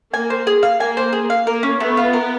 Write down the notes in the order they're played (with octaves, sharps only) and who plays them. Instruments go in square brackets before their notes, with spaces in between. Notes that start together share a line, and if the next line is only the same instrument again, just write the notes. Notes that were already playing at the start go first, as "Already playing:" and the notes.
[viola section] A#3 [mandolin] G#5
[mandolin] C5
G#4
F5
[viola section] A#3 [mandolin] G#5
[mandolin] C5
G#4
F5
[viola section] A#3 [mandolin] A#4
[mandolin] C#4
[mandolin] A3 [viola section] B3
[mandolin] F4
A#4